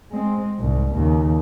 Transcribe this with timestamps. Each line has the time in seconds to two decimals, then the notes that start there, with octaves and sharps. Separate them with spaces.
0.11 G#3 C4
0.58 C2 G#2
0.94 D#2 C#3